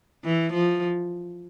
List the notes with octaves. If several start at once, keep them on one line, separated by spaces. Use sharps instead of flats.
E3
F3